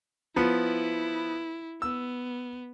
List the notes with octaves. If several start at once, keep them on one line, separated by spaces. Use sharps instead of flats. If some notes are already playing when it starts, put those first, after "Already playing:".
F3 B3 E4
B3 E6